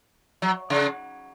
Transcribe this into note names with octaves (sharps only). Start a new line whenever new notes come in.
F#3
C#3